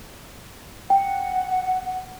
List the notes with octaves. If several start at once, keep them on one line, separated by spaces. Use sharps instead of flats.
F#5 G5